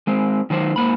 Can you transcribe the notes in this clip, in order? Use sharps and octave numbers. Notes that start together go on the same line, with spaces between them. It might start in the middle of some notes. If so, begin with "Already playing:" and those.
G#3 C4
D#3 F#3 C5
G#2 A#3 B5